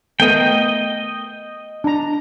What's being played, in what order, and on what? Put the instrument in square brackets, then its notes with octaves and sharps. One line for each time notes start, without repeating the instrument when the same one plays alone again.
[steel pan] A3 B3 A#4 [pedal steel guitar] D#5 G5
[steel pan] D4 A#5